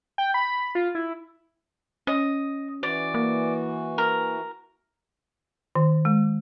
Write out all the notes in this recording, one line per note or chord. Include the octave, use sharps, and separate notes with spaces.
G5
B5
F4
E4
C#4 D#5
E3 F#4 D5
A#3
A#4
D#3
G#3